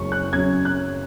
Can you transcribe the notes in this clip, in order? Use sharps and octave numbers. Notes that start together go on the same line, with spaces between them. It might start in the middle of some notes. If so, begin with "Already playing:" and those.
Already playing: F#1 F#2 F#3 C#4 C#6
F#6
F#1 F#2 F#3 C#4 G#6
F#6